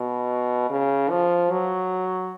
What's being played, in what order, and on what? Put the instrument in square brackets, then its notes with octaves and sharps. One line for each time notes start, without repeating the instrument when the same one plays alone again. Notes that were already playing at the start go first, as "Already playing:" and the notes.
Already playing: [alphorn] B2
C#3
F3
F#3